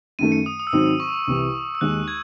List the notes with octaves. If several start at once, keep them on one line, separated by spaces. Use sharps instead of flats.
F#2 D#3 A3 D#7
C#7
D#6
D#6
E6
G#2 D#3 F#3 C4 D#4 D#6
C#6
C2 C3 E3
E6
D#2 D#3 G#3 D#4 F#6
G#6